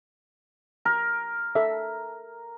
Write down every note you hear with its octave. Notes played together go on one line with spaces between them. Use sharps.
A#4
A4 E5